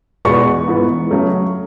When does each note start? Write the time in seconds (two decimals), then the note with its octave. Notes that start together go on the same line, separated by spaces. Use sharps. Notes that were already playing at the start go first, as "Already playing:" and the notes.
0.25 E2 B2 G#3 B3 C#6
0.68 G#2 E3 B3
1.10 C#3 F#3 A3